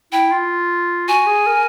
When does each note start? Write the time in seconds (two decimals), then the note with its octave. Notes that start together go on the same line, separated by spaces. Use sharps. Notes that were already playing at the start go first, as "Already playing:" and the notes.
0.12 E4 G5
0.32 F4
1.08 F#4 G#5
1.27 G#4
1.47 A#4